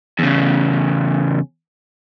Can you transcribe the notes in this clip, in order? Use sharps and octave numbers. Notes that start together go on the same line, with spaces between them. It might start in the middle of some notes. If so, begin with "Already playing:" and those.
E2 C#3